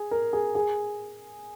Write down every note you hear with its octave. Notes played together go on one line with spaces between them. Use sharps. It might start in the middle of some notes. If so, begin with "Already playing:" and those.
Already playing: G#4
A#4
G#4
G#4